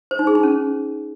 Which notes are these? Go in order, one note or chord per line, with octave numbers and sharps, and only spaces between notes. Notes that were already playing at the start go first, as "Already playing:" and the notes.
C5
D#4
G#4
D#4
C#4